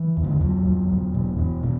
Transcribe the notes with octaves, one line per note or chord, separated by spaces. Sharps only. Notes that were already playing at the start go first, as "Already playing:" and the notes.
Already playing: E3
E2
D3
E3
E2 F#3
E2
E2
B2
E2 E3
B2